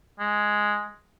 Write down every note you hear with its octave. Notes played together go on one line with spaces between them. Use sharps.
G#3